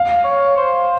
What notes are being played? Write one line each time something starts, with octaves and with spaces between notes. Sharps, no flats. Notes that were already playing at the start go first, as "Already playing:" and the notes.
Already playing: F5
C#5
C5